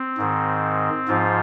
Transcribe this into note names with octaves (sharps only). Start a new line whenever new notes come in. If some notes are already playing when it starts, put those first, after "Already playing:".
Already playing: C4
G#2 D#3
G#2 F3 F4